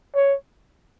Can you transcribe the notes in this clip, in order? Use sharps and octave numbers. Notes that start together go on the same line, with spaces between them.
C#5